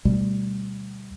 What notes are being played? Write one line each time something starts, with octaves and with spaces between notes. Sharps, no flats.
D2 B2 G3